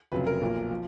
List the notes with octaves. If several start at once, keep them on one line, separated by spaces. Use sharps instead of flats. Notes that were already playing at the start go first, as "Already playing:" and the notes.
F1 F2 C#3 F#3 B4
A#4
B1 A#2 F3 A#3
F3